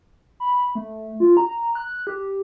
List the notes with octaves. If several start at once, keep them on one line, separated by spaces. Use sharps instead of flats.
B5
A3
F4
A#5
F#6
G4